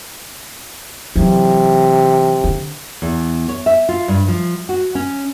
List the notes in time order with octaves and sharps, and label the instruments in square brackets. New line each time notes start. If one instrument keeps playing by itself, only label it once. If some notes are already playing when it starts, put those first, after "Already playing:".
[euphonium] C3 [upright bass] E3 F#3
[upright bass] D3
[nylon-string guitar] E2
C#5
E5
F4
G2
F3
F#4
C#4